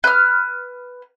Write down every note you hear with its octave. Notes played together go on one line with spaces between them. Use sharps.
B4 F6